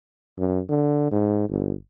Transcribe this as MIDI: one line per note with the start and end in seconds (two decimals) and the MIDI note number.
0.38 0.60 42
0.69 1.07 50
1.12 1.45 44
1.49 1.73 31